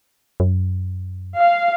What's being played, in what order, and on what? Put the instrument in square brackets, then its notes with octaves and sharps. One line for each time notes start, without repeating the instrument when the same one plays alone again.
[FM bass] F#2
[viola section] F5